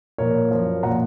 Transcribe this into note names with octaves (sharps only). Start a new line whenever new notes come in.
A#2 F3 A#4 C#5
F#2 F3
A#2 F3 F#5 A#5